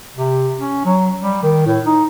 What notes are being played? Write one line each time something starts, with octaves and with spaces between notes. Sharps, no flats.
C3
C#4
F#3
G3
D#3
A2
D#4